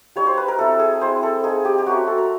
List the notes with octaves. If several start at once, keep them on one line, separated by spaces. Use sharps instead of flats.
G3 A#3 D#4 C#5
C5
B4
A#4
A3 C4 E4 A4
G#4
G#3 C4 E4 C5
A4
A#3 D#4 G#4
G4
G4
F#3 A3 C#4 F#4
A4
A#4